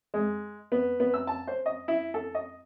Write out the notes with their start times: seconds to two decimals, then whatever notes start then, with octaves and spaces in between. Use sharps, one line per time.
0.14 G#3
0.72 B3
1.00 B3
1.14 E6
1.27 A5
1.47 C5
1.66 D#5
1.88 E4
2.14 A4
2.35 D#5